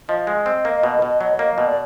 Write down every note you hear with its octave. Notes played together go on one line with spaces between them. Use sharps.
F3 D#5
G#3
C4
A#3
B2
B2
F#3
A#3
B2
D5